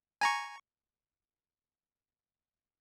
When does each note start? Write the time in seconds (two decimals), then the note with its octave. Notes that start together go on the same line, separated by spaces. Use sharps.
0.21 G#5 A#5 C#6